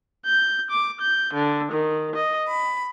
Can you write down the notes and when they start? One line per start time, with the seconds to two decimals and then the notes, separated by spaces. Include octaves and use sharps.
0.24 G6
0.70 D6
0.99 G6
1.33 D3
1.72 D#3
2.15 D#5
2.48 B5